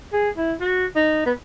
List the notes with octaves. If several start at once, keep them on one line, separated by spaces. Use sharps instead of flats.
G#4
E4
F#4
D#4
B3